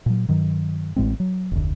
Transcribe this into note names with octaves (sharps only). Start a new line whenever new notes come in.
A#2 F#3
G2 D#3 F#3
A1 A2 G#3 C4
F#3
F1 D2